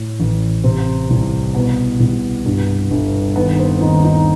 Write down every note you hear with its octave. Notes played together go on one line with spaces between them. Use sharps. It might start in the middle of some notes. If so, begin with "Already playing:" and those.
Already playing: A2
A1
C3 C4
C2
B2 B3
C2
G2
G1
D#3 B3
C4
D#2 D#4
D#4